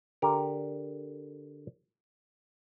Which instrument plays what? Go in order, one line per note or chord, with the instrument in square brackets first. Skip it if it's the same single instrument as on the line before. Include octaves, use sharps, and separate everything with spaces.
[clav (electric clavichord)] D3 G4 A#4